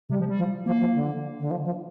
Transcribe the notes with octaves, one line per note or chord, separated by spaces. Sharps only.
C3 G3
F3
G3
F3
F3 A#3
F3
D3
D3
F3
F3